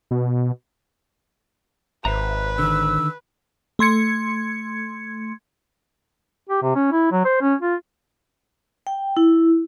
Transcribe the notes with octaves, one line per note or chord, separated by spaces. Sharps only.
B2
G#1 B4 C5 E5 A#5
D3 D#3 E6
A3 C6 G#6 C#7
G4
C3
C#4
E4
F#3
C5
C#4
F4
G5
E4